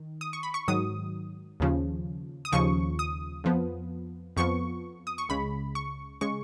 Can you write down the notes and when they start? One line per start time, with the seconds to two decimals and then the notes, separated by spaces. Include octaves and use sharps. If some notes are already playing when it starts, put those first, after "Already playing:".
Already playing: D#3
0.21 D#6
0.33 C#6
0.43 B5
0.54 C#6
0.68 G#2 D#3 F#3 D#6
1.60 D#2 C#3 F3
2.45 D#6
2.52 D#2 C#3 F3 C#6
2.99 D#6
3.44 F2 F3 B3
4.37 F2 F3 B3 C#6
5.07 D#6
5.18 C#6
5.29 C#2 C#3 G#3 B5
5.75 C#6
6.21 C#3 G#3 C#6